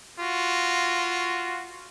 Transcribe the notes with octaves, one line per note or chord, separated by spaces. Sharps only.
F4 F#4